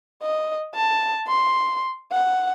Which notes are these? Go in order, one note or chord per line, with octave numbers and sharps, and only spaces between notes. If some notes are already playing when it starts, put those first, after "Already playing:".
D#5
A5
C6
F#5